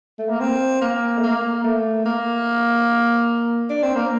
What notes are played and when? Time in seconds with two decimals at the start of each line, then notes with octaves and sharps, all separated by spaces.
0.18 A3
0.29 A#3
0.40 C4
0.82 A#3
1.18 A3
1.23 A#3
1.64 A3
2.06 A#3
3.70 D4
3.83 C4
3.96 A#3